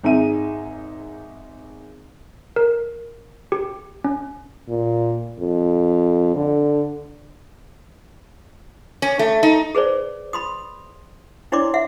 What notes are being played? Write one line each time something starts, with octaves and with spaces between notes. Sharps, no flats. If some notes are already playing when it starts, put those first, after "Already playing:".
G#1 D#4 G#4 E5 D#7
A#4
G4
C#4
A#2
F2
D3
C#4
A3
D#4
G#4 B4 C5 D5
B5 C6 D#6
D4 E4 C#5 D5 C6 D6
E5 F#5